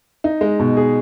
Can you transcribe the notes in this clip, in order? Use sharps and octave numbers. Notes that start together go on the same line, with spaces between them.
D#4
G#3
B2
G#4